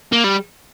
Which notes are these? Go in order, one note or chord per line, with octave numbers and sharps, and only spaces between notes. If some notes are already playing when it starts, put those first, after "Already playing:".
A#3
G3